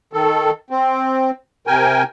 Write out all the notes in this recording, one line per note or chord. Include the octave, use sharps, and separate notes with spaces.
D#3 A4
C4
C3 A#4 G5 G#5